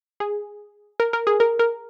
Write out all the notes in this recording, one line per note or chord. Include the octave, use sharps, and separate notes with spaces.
G#4
A#4
A#4
G#4
A#4
A#4